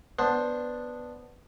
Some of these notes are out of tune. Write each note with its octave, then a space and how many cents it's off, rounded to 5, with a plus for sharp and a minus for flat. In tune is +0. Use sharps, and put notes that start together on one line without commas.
B3 +0 D4 +0 C5 +5